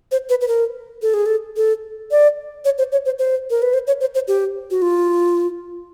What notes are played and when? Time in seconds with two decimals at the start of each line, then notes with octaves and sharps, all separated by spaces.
0.12 C5
0.29 B4
0.41 B4
0.48 A#4
1.02 A4
1.14 G#4
1.26 A4
1.56 A4
2.11 D5
2.65 C#5
2.78 C5
2.92 C#5
3.05 C5
3.19 C5
3.50 A#4
3.62 B4
3.73 C5
3.87 C#5
4.01 C5
4.14 C5
4.28 G4
4.71 F#4
4.82 F4